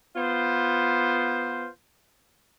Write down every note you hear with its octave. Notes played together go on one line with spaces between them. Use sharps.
B3 F4 C5